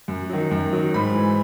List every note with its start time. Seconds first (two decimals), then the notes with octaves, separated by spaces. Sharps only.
0.08 F#2
0.29 D#3 F#3
0.51 F#2
0.72 D#3 F#3
0.94 G#2 B5
1.15 E3